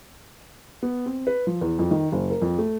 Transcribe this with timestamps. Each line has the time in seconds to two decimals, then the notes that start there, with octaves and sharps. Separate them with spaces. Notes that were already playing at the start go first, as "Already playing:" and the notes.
0.83 B3
1.06 C4
1.27 B4
1.47 F3
1.61 E2
1.79 F2
1.91 D#3
2.12 F#1
2.30 A#4
2.42 F2
2.58 A3